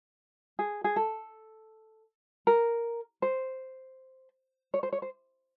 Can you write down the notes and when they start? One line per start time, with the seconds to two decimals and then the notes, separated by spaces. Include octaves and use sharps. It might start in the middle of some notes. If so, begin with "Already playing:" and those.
0.59 G#4
0.84 G#4
0.96 A4
2.47 A#4
3.22 C5
4.74 C#5
4.83 C5
4.93 C#5
5.02 C5